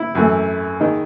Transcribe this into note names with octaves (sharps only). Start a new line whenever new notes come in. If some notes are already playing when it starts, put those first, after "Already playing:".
Already playing: E4
F#2 E3 A3
D#3 G#3 D#4